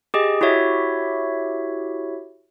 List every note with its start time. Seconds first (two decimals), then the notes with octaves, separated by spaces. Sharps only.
0.14 G4 G#4 D#5
0.41 E4 F#4 G4 C#5 E5